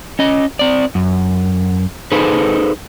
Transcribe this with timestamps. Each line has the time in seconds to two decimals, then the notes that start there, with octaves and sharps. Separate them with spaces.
0.19 C#4 D#5
0.59 C4 D5
0.95 F#2
2.12 D#4 G#4 A4 B4 C5